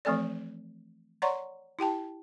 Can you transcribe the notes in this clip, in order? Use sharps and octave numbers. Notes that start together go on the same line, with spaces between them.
E3 F3 A3 C4 A4 D5
C#5 D5 F#5 A#5 C6 C#6
E4 G4 G5 A5